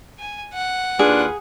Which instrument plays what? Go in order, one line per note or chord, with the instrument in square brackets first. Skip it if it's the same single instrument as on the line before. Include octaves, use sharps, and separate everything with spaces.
[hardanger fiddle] G#5
F#5
[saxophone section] D#2 F4 B4 [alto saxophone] D4 [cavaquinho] G#4